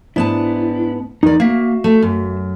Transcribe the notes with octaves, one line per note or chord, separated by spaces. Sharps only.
G#2 B3 D4 E4 A5
E2 D#4 A#4 D5
A#3 F#4 E5 F5
A3
F#2